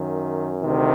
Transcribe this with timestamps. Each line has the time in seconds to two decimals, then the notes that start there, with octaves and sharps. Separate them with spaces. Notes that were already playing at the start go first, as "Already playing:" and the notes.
Already playing: F#2 D#3
0.61 D2 C3 D#3